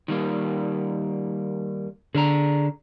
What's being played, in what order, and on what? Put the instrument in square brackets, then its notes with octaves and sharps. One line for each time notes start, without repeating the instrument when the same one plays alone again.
[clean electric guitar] D#3 G3 A#3
[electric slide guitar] D3 [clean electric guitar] G#4 D5 A#5